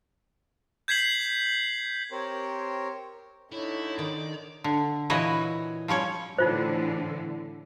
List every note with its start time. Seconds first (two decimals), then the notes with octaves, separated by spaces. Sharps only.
0.88 G6 G#6 B6 C7 F#7
2.11 C4 G4 A#4 C5 C#5
3.52 D3 D#4 E4 C#5
3.99 D#3 D5
4.64 D3
5.10 A#2 E3 F#4 B4 C#5 D#5
5.88 F3 G3 C#4 C#5
6.38 A2 D3 E3 D#4 F4 C5